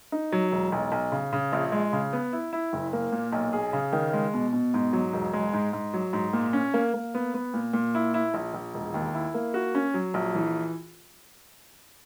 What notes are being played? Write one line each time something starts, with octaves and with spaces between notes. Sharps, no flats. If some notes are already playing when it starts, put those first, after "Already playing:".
D#4
F#3
E1
B1
B1
C#3
C#3
A#1
G#3
C#3
B3
E4
E4
F#1
A#3
A#2
B1
G#4
C#3
D#3
G#3
B2
B2
G#2
F#3
E1
G#3
G#2
G#2
F#3
G#2
A#2
C#4
A#3
A#3
B3
B3
A#2
A#2
E4
E4
A#1
A#1
E1
D#2
E4
A#3
F#4
C#4
F#3
A#1
E3